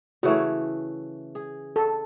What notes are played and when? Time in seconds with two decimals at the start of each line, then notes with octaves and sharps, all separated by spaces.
0.23 C#3 E3 A3 F#4 C#5
1.35 G#4
1.76 A4